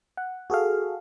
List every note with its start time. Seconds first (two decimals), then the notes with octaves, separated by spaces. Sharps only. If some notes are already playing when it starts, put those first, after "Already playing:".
0.17 F#5
0.50 F#4 G#4 A4 F5